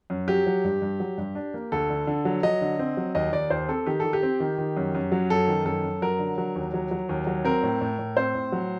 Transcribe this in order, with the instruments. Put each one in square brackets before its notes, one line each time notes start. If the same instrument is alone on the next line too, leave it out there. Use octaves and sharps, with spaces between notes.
[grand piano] F#2
F#3 G4
F#3
G2
G2
F#3
G2
D4
A#3
D2 A4
D3
D3
F#3
F#3 D#5
D3
C4
F#3
D#2 D#5
D#2 D5
D#2 C5
C4 A4
D#3 G4
D#3 A4
G4
C4
D#3
D#3
F#2
F#2
F#3
F#2 A4
D#3
F#2 A4
F#2
F#3 A#4
D3
F#3
D#2
F#3
F#3
D#2
F#3
C4 A#4
A2
A2
A2
C4 C5
A2
F#3